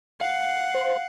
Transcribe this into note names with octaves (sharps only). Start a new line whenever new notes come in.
F5 F#5
C5